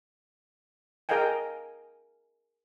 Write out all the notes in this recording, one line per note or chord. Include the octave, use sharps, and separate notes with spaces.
G#4 A#4 D#5 F5 G5 G#5